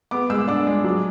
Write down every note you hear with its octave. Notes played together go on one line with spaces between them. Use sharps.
B3 D6
G#3 E6
D4 D6
G#3
F#3